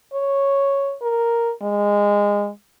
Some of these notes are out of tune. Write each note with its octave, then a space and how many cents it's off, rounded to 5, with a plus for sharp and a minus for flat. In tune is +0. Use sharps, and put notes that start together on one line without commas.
C#5 -5
A#4 +0
G#3 -20